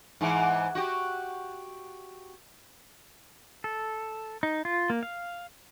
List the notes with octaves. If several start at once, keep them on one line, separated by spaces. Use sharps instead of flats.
G#2 E3
F#4 G4
A4
D#4
F4
A#3
F5